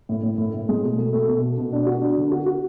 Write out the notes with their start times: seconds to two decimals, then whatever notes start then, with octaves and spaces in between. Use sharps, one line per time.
0.09 A2
0.23 A2
0.38 A2
0.54 A2
0.69 G#3
0.83 B2
0.97 A3
1.13 A3
1.27 B2
1.42 A3
1.58 B2
1.73 D4
1.87 F#4
2.02 D4
2.17 D3
2.31 F#4
2.46 F#4